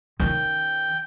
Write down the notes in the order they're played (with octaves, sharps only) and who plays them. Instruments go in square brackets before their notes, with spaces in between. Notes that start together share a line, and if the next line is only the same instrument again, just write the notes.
[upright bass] D#3 C#4 [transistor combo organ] G5